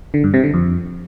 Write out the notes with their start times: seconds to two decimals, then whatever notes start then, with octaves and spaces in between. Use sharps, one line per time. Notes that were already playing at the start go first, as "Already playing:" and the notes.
0.14 D3
0.24 G2
0.34 C3
0.44 D3
0.54 F2